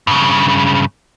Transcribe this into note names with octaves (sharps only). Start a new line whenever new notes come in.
G2 C#3